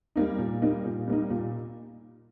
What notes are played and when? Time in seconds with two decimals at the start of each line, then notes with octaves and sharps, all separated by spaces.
0.16 G3 A#3 D#4
0.38 A#2
0.62 G3 A#3 D#4
0.85 A#2
1.08 G3 A#3 D#4
1.30 A#2